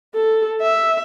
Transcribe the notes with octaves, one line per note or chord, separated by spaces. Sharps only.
A4
E5